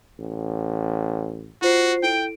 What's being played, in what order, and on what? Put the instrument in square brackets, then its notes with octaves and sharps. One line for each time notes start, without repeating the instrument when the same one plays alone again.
[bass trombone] A1
[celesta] F4 C5 C7 [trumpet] F#4
[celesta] E4 A4 D7 [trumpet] G5